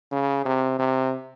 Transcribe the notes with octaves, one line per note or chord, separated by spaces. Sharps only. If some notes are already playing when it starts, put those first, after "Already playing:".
C#3
C3
C3